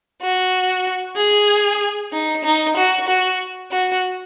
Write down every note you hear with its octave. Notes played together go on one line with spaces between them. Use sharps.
F#4
G#4
D#4
D#4
F#4
F#4
F#4